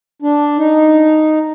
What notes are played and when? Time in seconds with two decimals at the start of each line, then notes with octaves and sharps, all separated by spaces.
0.22 D4
0.58 D#4